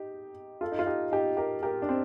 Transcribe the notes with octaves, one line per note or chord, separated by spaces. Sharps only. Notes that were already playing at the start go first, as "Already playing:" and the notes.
Already playing: D#4 G4
F4 A4
D#4
F4
D#4 G4
D#4 G4
G4 A#4
G4 A#4
D4
C4